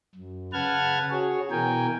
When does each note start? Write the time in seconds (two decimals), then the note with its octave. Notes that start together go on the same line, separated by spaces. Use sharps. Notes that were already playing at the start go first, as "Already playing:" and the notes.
0.15 F#2
0.53 C#3 B4 F#5 A5 F6 G#6
1.10 F#4 G#4 C#5
1.51 B2 E3 A#4 G5 G#5